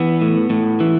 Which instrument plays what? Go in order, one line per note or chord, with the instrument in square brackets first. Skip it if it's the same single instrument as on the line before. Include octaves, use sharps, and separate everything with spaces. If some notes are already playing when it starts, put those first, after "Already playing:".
Already playing: [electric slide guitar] E3 B3
A2
A2
E3